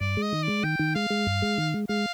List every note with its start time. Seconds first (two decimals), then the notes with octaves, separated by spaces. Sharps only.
0.01 G2 D5
0.17 G#3
0.22 D#5
0.33 D#3
0.43 G#3 D5
0.63 D#3 G5
0.79 D#3
0.95 G#3 F5
1.10 G#3
1.27 G2
1.42 G#3
1.58 D#3
1.74 G#3
1.89 G#3 F5